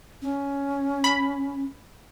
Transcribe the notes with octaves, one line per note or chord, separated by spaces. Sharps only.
C#4
B5